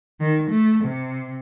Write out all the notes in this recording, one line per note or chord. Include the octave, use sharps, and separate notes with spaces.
D#3
A3
C3